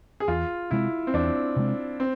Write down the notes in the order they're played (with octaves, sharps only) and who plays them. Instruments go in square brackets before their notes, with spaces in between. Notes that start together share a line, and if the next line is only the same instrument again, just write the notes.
[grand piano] G#4
[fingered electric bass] E2 [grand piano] F4
[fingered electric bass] C3 G#3 C4 [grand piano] E4
[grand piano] C4
[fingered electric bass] E2 [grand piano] D4
[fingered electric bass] C3 G#3 C4
[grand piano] C4